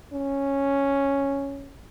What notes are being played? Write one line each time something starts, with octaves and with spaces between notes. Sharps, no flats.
C#4